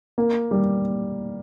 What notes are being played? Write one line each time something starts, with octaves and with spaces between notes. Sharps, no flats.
A#3
G3